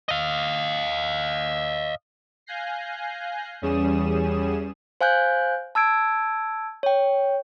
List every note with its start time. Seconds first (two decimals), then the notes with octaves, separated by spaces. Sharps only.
0.09 D#5 F5
2.47 F5 G#5 F#6 G6 A#6 C7
3.62 E2 G3 C#4 G#4 D#6 E7
5.01 C5 F5 G#5 F#6 G6
5.75 A5 E6 G#6 D7
6.83 C#5 G5